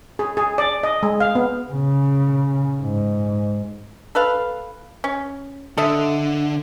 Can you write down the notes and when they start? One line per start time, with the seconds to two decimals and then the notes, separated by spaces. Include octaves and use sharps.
0.19 G#4
0.37 G#4
0.58 D5
0.83 D#5
1.03 G#3
1.20 F5
1.35 B3
1.71 C#3
2.82 G#2
4.15 A4 B4 F5
5.04 C#4
5.77 D3 A4 D#5 E5